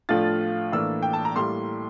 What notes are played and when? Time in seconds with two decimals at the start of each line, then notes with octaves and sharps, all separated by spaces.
0.09 A2 F3 A3 D4 F4 A6
0.72 A2 E3 A#3 D4 E6
1.03 G5
1.13 A5
1.25 A#5
1.36 A2 G3 A#3 E4 C6